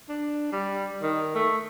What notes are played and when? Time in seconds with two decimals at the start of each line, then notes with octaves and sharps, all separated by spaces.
0.09 D4
0.52 G3
1.02 D#3
1.35 A3